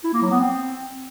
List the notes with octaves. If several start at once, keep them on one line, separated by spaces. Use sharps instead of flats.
E4
A#3
F#3
B3
C4